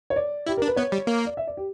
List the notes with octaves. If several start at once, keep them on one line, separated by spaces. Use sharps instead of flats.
C#5
D5
E4 G4
D4 A#4
B4
B3 C#5
G3
A#3
D5
E5
D5
G4